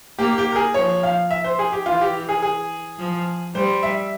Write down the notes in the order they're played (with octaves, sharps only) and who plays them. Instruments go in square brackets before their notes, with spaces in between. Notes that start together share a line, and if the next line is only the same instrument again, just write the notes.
[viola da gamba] A#3 [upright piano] G4
[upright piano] G4
A#4
G#4
[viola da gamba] F3 [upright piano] C#5
[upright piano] F5
E5
C5
G#4
G4
[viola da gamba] E3 [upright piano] F4
[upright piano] G4
G#4
G#4
[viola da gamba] F3
[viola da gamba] G3 [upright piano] C5
[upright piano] E5